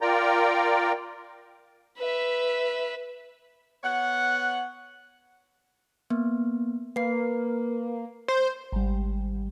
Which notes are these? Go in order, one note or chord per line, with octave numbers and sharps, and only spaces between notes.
F4 A#4 D5 G5 A#5
B4 E5
B3 C#5 F#5
A#3 B3
A#3 B4 C7
C5
G#1 G3